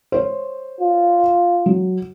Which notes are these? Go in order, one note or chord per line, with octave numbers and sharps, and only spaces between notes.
C5 C#5
F4
F#3